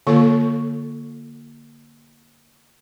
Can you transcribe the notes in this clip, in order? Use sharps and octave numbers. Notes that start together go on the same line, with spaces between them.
D3 A#3 F4 A4 C#5 C#6